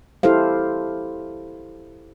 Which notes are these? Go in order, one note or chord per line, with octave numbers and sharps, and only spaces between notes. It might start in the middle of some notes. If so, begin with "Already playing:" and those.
E4 G4 A4 C5 F5